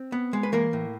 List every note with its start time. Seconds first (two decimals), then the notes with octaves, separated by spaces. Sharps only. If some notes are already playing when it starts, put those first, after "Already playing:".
Already playing: C4
0.12 B3
0.33 G#3
0.43 B4
0.52 E3 A#3 A#4
0.73 A2